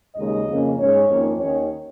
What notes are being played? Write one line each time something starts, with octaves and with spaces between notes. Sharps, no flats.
D#2 C#3 G#3 D#5
F2 C#3 A#3 C#4
G#2 G#3 C#4 C#5
F2 D#3 A#3 C#4
D#2 D#3 C#4 C#5